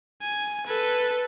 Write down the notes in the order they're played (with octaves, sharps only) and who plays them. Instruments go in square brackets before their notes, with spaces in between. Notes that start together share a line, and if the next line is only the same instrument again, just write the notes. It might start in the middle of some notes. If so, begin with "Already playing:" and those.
[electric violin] G#5
A4 B4